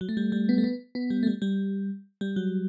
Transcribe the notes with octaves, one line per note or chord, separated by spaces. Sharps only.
F#3
A3
G3
G3
B3
A3
B3
B3
G3
A3
G3
G3
G3
F#3